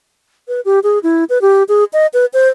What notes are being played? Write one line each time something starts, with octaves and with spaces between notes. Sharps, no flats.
B4
G4
G#4
E4
B4
G4
G#4
D#5
B4
C5